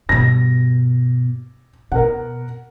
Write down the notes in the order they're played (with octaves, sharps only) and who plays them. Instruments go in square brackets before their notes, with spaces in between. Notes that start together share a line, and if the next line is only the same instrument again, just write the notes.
[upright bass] G2 B2 [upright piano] A#6
[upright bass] B2 [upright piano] A#4 F#5